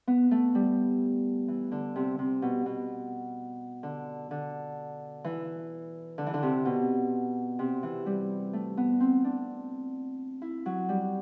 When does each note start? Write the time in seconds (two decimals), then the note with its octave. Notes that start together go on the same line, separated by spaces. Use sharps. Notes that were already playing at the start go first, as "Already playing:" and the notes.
0.07 B3
0.31 A3
0.55 G3
1.48 E3
1.72 D3
1.96 C3
2.19 C3
2.42 B2
2.66 B2
3.83 D3
4.31 D3
5.24 E3
6.18 D3
6.27 E3
6.34 D3
6.43 C3
6.65 B2
7.59 C3
7.83 E3
8.06 G3
8.53 A3
8.77 B3
9.00 C4
9.25 D4
10.42 E4
10.66 F#3
10.89 G3